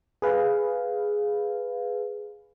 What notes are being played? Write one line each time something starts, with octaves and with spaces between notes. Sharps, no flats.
G#4 B4 F5